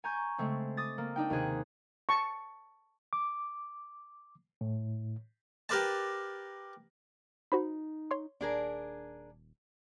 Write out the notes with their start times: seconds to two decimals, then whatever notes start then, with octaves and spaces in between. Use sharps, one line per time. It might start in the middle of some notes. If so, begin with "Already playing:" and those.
0.04 G#5 A#5 C#6 G6
0.38 C#3 G#3 A3 C4
0.77 D6 D#6 A6
0.98 A#3
1.16 D4 D#4 G5
1.30 D#2 C3 G#4 F#6
2.09 A5 C#6
3.13 D6
4.61 A2
5.69 G4 A#4 B4 D5 A5
7.52 D#4 F#4 C5 B5
8.11 C#5 C6
8.41 D#1 D4 G#4 A#4